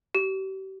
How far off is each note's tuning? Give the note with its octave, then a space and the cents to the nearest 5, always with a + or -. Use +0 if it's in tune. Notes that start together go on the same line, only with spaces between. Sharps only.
G4 -40